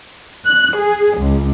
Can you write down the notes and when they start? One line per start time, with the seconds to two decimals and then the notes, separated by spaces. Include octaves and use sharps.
0.45 F#6
0.78 G#4
1.18 C#2